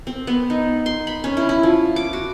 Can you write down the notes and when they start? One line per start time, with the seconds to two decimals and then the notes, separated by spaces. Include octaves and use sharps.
0.07 C4
0.27 B3
0.50 D#4
0.86 C6
1.07 B5
1.24 C#4
1.37 E4
1.49 E4
1.63 F3
1.96 D6
2.13 F#4